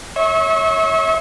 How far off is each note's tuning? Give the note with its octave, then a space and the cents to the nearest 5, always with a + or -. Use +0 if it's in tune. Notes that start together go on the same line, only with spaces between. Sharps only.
C#5 +0 E5 -35 C#6 -30